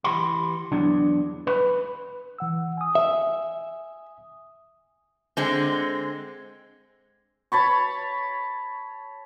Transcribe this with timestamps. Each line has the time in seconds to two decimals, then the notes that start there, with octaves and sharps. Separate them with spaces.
0.04 E3 G4 B5 C6
0.72 E2 F#3 D4
1.47 B4
2.38 E3 F#5 E6
2.77 G#5 D#6
2.95 E5
5.37 D3 G#3 C4
7.52 C#5 A5 B5 C#6